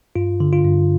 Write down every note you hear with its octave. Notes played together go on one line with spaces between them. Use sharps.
G2 F4
D3
F4
G2